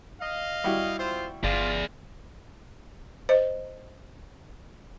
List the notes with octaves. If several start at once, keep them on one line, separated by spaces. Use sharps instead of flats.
D#5 F5
G3 E4 F#4
C4 F4 C5
G1 F4 G#4 D5
C5 D#5